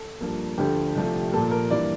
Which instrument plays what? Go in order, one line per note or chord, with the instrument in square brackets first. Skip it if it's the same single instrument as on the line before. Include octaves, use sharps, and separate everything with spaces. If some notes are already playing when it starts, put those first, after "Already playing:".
Already playing: [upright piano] A4
G2 F3 A#3
D2 D3 F3 A3 G4
C2 C3 F3 A3
A#2 F3 A#3 A4
A#4
G2 E3 A#3 D5